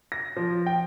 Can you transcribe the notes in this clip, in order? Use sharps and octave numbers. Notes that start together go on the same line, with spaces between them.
A#6
F3
G5